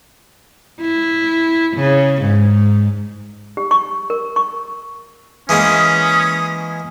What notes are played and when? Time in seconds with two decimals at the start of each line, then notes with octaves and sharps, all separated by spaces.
0.81 E4
1.77 C#3
2.22 G#2
3.57 G4
3.71 C#6
4.10 A#4
4.36 C#6
5.49 E3 G#3 A#3 C#4 D#6